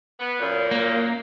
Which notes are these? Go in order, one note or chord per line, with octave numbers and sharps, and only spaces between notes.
B3
F#2 A#2
A#3